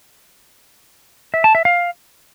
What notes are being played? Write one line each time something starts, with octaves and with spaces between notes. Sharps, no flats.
E5
A5
E5
F5